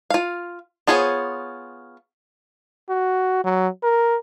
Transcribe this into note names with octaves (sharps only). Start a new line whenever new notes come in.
F4 F5
B3 F4 G#4 C5 C#5
F#4
F#3
A#4